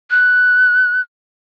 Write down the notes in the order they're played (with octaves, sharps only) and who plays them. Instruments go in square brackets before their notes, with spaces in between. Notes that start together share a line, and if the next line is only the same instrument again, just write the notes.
[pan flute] F#6